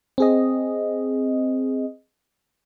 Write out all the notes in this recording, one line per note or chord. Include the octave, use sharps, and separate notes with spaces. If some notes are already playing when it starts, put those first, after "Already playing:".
C4 G#4 D#5